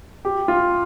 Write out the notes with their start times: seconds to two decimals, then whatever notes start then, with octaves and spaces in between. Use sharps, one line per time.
0.25 G4
0.48 F4